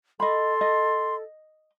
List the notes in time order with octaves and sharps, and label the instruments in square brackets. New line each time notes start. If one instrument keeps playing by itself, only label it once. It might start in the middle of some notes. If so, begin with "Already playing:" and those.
[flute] A4 [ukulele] D#5 B5 [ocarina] C6
[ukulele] D#5